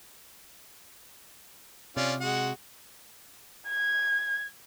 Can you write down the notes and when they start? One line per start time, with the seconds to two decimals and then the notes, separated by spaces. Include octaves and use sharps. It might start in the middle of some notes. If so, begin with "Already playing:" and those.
1.97 C3 C#4 F4 D5
2.20 G#3 F#4 F#5
3.69 G#6